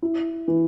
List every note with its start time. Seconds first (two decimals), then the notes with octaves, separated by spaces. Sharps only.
0.02 E4
0.48 E3